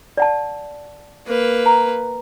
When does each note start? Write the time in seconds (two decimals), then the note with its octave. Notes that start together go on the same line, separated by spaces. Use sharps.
0.17 D5 F#5 A5
1.27 A#3 B4
1.66 A#5